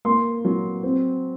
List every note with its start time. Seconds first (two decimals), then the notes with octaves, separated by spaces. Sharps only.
0.05 A#3 C6
0.45 F#3
0.83 C4